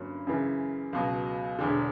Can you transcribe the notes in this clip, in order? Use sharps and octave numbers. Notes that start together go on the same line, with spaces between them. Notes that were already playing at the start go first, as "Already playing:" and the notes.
Already playing: G1 G2 F#3 A#3 C#4
F#2 C#3 E3
C#2 B2 F#3
E1 E2 D3